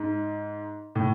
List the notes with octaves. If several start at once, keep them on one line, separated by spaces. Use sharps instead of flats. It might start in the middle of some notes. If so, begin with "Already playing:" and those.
Already playing: G#2
A2